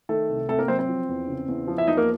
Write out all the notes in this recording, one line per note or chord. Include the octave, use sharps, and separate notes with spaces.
D#3 A3 A4
C2
C3 A3 A4
A#3 A#4
F#3 C4 C5
C4 C5
F3
E2
C#3
E2
F3
E4 E5
E2 D#4 D#5
A#3 A#4